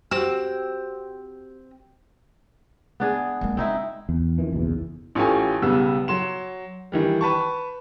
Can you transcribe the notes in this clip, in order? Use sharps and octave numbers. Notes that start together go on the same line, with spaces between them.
C4 F#4 G4 E6
B3 D4 G#4
G#3 A#3
C4 D#4 E4
E2
F2 D#3 E3
F#1 B1 E2
A1 C#4 F4 G4 A4 G#5
B1 C#3 G3 B3 E6
F#3 C6 E7
D#3 E3 G3
B4 A5 C#6